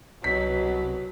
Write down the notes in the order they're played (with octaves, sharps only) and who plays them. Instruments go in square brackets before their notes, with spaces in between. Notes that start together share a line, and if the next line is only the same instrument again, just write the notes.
[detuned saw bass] C2 [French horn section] B2 [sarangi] F#3 [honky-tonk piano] B6